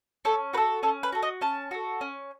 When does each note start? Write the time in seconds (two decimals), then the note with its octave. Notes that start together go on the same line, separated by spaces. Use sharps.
0.25 C#4 A4
0.53 F#4 B4
0.57 A4
0.83 C#4 A4
1.03 B4
1.12 F#4 A4
1.23 D#5
1.41 C#4 A5
1.71 F#4 A4
2.01 C#4